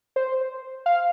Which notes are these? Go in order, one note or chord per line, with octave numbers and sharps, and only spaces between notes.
C5
F5